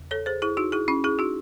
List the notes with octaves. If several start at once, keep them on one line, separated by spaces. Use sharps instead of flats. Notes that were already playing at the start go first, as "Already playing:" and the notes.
Already playing: E2 C#3
A4 C#5
G#4 C5
E4 G#4
D#4 F#4
E4 G#4
C#4 E4
E4 G#4
D#4 F#4